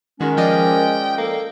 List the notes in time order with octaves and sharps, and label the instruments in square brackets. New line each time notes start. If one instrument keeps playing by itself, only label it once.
[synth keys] D#3 [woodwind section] G#3 C#4 [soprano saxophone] F#4 [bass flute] A#4
[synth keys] F3 D5 D#5 [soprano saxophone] G5
[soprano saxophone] A#3 [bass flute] A4